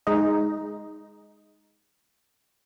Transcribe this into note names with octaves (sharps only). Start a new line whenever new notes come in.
G#3 D#4